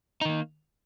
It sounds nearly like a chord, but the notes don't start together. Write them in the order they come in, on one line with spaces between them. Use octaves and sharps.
D#4 D#3 A#3